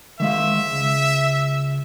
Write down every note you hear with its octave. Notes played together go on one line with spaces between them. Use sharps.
D#3 G#3 E5 F5
C#2